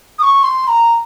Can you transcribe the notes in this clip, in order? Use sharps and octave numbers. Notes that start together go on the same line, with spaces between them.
D#6
C#6
C6
A#5